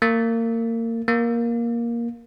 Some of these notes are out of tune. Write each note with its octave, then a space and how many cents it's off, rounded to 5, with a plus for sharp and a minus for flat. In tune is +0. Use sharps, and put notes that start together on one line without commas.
A#3 -30
A#3 +10